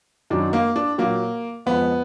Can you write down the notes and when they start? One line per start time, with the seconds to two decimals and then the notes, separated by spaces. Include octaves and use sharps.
0.30 F#2 D#3 F#3 D4
0.53 A#3
0.76 D4
0.98 A#2 F#3 A#3
1.66 F2 F3 G#3 B3